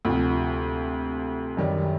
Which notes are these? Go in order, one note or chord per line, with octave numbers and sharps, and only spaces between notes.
D2 C3 F3
F#2 D#3 G3